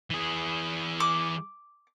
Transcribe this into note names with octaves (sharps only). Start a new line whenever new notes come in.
E3 G#4
D6